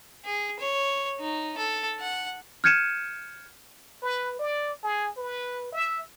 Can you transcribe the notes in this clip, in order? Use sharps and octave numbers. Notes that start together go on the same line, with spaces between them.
G#4
C#5
D#4
A4
F#5
F6 G6 G#6 C#7 D#7 E7
B4
D5
G#4
B4
E5